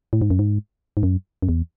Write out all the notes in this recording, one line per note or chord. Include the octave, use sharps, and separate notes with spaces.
A2
G#2
F#2
G#2
G#2
F#2
F#2
E2